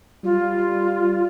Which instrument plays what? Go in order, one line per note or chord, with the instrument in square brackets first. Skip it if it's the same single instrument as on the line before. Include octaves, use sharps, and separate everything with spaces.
[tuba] G3 [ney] F4